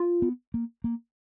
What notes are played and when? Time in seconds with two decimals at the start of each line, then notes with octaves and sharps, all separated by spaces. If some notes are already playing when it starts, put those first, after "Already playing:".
Already playing: F4
0.22 B3
0.54 A#3
0.84 A#3